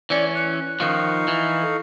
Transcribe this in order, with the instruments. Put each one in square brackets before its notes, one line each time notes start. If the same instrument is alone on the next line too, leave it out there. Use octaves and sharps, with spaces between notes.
[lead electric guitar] E3 C#4 [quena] D5
[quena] F#6
[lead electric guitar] D#3 F3 [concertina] D#4 F5 C#6
[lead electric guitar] E3
[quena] A4